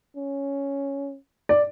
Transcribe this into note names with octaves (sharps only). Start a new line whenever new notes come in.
C#4
D5